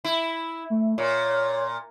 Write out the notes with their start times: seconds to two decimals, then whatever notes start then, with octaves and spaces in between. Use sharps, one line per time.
0.05 E4
0.70 A3
0.98 A#2 C#5